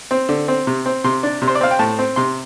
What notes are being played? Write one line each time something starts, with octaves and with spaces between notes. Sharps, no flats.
C4
D3
C4
C3
C4
C3 C6
D4
C3
C5
D5
C4 F5
G5
A2 A5
C4
C3 C6